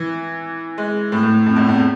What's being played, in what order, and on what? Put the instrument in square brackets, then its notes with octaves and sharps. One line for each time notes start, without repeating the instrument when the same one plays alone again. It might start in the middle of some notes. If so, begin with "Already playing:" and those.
Already playing: [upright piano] E3
G#3
A2
A2
F2
E2
F2